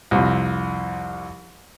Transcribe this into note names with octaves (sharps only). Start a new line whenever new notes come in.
C2 F2